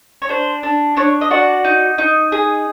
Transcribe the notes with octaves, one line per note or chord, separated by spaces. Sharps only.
C#5
D4 C5
D4
D4 C#5
D#5
F#4 D5
D#4
D#4
G#4